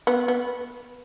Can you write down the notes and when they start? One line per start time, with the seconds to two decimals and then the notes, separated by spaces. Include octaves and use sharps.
0.07 B3
0.28 B3